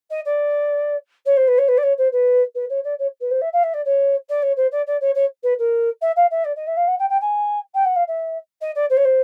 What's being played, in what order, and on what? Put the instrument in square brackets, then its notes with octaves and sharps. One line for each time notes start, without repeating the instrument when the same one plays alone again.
[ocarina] D#5
D5
C#5
C5
B4
C#5
B4
D5
C#5
C5
B4
B4
C#5
D5
C#5
B4
C5
E5
F5
E5
D5
C#5
D5
C#5
C5
D5
D5
C#5
C#5
B4
A#4
E5
F5
E5
D5
D#5
E5
F5
F#5
G5
G5
G#5
G5
F#5
F5
E5
D#5
D5
C5
C#5
C5